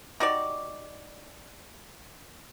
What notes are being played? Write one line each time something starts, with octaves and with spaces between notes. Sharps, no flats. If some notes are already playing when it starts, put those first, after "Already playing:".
D#4 F#4 G4 D5